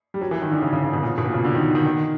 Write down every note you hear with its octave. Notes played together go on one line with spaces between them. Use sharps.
G3
F#3
E3
D#3
D3
C#3
C#3
C#3
B2
A#2
B2
A#2
C#3
D3
D#3
D#3
D#3